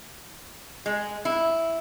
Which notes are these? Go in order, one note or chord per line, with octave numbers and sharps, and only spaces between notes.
G#3
E4